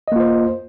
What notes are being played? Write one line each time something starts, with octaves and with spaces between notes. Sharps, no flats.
A#3 F4 C5 D#5